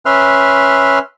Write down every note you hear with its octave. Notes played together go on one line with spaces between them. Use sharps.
C#4 B4 E5 C6 F6